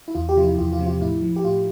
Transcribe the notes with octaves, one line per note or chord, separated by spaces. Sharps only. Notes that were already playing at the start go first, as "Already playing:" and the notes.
E4
E2 F4
G4
C3 F3 F4
E4
E2 F4
F4
C3 F3
F4
A2 E4
F3
G4
A2 F4